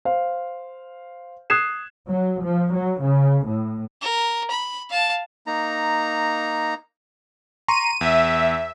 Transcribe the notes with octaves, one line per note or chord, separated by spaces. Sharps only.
C5 F5
D#6 F#6 G#6 C7 E7
F#3
F3
F#3
C#3
A2
A#4
B5
F5 A5
A#3 D#4 A#5
A#5 C6 C#6 D#7
E2 E5